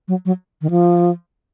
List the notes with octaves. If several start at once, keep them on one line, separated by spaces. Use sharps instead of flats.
F#3
F#3
D#3
F3